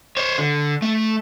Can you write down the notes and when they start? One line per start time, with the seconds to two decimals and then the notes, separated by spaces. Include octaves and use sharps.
0.17 C5 C#5
0.38 D3
0.82 A3